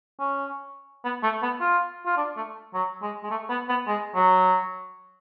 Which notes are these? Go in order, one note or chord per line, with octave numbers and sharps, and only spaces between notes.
C#4
B3
A3
B3
F4
F4
D4
A3
F#3
G#3
G#3
A3
B3
B3
G#3
F#3